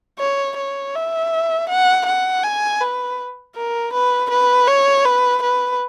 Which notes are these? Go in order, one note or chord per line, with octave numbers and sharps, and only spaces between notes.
C#5
C#5
E5
F#5
F#5
G#5
B4
A#4
B4
B4
C#5
B4
B4